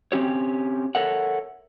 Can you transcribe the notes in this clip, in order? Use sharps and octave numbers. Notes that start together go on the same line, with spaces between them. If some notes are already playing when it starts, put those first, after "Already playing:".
C4 C#4 G4 C#5
A4 A#4 C#5 E5 F#5